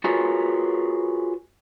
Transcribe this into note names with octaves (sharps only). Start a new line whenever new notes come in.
F4 F#4 G#4 A#4 B4 C#5